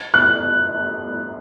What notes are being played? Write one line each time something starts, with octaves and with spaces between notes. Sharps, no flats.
F#6